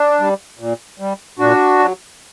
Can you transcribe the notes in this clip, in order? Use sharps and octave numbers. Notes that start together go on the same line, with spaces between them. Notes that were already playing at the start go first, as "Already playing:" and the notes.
Already playing: D4
G3
A#2
G3
A#2 D4 F#4
F#3